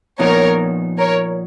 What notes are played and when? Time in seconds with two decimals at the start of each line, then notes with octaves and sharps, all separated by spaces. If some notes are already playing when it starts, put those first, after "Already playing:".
0.19 A#2 F3 B3 D#4 A#4 C#5
0.99 A#4 C#5